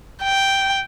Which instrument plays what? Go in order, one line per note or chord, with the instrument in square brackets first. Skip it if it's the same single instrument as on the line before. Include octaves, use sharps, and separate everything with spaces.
[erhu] G5